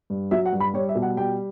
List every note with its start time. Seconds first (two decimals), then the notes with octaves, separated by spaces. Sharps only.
0.10 G2
0.31 F#3 E5
0.46 F#5
0.53 G2
0.60 B5
0.74 G3 C#5
0.89 E5
0.95 B2
1.02 F#5
1.17 G3 G5